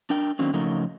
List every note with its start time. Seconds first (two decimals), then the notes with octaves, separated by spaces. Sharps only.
0.10 D4 A#4 G5
0.39 D3 D#3 F#3 A#3 C4 C#4
0.54 C#3 F3 F#3 A3 D#4 A#4